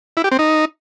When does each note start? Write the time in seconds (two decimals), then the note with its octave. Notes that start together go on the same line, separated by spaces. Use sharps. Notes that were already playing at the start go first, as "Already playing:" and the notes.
0.17 E4
0.24 G4
0.31 C4
0.39 D#4